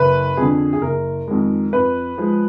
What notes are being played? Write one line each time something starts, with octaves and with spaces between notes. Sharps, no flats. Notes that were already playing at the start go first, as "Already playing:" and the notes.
Already playing: F#1 B4
F2 D3 G#4
G#4
F#1 A#4
F2 D#3 G#3
F2 B4
F3 G#3